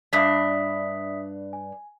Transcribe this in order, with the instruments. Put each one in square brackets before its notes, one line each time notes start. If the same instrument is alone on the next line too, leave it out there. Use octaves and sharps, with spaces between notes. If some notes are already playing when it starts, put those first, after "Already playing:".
[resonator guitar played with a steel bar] G2 D4 [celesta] E5 D#6 B6
[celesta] G#5